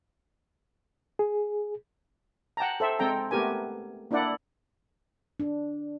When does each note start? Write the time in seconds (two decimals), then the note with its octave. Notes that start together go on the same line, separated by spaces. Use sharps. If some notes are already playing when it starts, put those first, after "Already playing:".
1.19 G#4
2.57 F#5 G5 A5 A#5
2.80 A4 C5 E5 G5
2.99 G#3 C4 A4 G5 A#5
3.31 A3 B3 G4 A#4 G#5
4.11 A#3 D4 E4 D5 F#5
5.40 D4